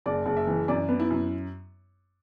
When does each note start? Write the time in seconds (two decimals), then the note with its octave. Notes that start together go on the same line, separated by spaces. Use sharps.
0.06 F#1 D5
0.26 F#1
0.37 E5
0.47 E3
0.68 F#2 D5
0.89 B3
1.00 E4
1.11 F#2